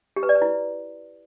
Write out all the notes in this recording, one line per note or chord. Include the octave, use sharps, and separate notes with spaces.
G4
B4
D5
B4
E4